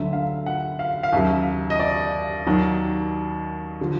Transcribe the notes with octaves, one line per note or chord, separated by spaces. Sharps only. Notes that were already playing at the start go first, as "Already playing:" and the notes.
Already playing: D2 D3 F#3 E5
F5
F#5
F5
F5
D#2 C#3 F#3 E5
D#5
D5
D#2 D#3 F#3
D3 F3